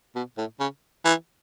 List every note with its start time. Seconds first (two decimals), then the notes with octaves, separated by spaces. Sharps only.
0.15 B2
0.38 A2
0.60 C#3
1.05 E3